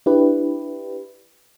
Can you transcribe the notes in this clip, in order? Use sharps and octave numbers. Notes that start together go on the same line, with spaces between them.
D4 E4 G4 B4